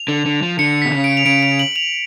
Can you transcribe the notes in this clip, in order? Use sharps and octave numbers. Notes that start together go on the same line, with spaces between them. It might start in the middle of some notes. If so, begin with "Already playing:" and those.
Already playing: F7
D3
D3
F3
D3 C#7
B2 B6
C#3
D7
F7
C#3 D7
F7
F#7
F7